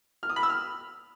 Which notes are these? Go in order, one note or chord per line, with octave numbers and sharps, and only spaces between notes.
F6
D#6
B5
E6
F6